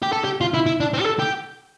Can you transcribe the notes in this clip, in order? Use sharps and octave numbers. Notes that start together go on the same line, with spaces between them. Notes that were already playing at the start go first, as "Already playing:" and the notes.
G4
A4
G4
F4
E4
E4
D4
C4
G4
A4
G4